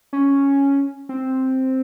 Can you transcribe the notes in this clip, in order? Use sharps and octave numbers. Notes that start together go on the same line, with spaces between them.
C#4
C4